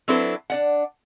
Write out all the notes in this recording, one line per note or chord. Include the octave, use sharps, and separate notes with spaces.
F#3 C4 D4 E4 A4 B4
D4 D5 F#5